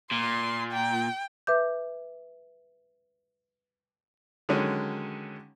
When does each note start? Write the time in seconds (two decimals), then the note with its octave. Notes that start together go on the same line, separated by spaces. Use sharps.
0.12 A#2 C6
0.72 G5
1.47 B4 E5 D6 G6
4.49 D3 D#3 F#3 G#3 C#4